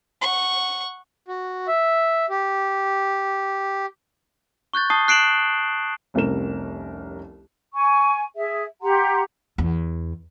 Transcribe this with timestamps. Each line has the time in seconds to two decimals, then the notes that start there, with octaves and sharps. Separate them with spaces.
0.21 F#5 C#6
1.28 F#4
1.67 E5
2.30 G4
4.73 C#6 F#6 G6 A6
4.90 A5 D#6 C7 G7
5.08 F#6 C7 D7 E7 F#7
6.14 F1 C2 C#4 A#4 E7
7.73 G#5 C#6
8.36 G#4 E5
8.81 G4 F#5 A#5 C6
9.58 E2